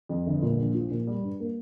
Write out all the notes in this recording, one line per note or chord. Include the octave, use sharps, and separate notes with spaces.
F2
G1
A#2
A#1
F3
A#2
G3
G2
A#3